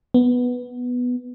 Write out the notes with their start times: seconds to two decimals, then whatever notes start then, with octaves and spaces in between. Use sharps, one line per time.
0.14 B3